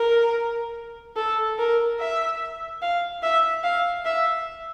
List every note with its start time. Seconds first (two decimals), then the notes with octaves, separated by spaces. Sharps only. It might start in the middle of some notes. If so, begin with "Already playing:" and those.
Already playing: A#4
1.16 A4
1.58 A#4
2.00 E5
2.82 F5
3.23 E5
3.63 F5
4.05 E5